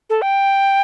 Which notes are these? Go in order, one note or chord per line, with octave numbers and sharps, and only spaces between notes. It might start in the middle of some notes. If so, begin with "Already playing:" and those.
A4
G5